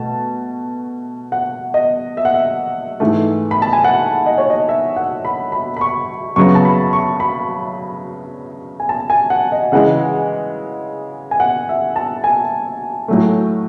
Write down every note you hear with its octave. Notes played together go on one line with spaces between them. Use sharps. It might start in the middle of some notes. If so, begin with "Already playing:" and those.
Already playing: B2 A3 A5
F#5
D#5
E5
F#5
E5
G#2 E3 A3
B5
A5
G#5
F#5
D#5
C#5
D#5
E5
F#5
B5
B5
B5
C#6
F#2 C#3 F#3 B3 C#6
A5
B5
C#6
B5
G#5
A5
G#5
F#5
D#5
C#3 E3 G#3 F#5
G#5
F#5
E5
A5
G#5
A2 F#3 A3